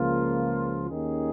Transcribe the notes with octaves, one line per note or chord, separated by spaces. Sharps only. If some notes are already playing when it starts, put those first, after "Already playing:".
Already playing: C#2 C#3 F3 A#3 F4
D#2 D#3 C#4 G#4